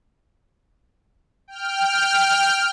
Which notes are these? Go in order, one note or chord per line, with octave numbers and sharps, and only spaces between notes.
G5 F6